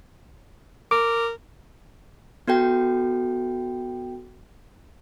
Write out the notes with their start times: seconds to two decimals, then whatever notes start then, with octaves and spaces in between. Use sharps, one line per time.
0.91 A#4 D6
2.48 B3 F#4 A4 G5